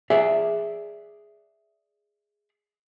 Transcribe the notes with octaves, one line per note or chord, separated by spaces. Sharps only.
G#4 D5 E5